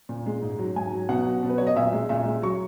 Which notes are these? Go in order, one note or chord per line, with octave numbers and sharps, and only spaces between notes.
A#2
G#3
G#2
F#3
G#2 G#5
F#3
B2 F#5
F#3
B2
B4
F#3 C#5
D#5
A#2 E5
G#3
A#2 E5
G#3
F#3 C#6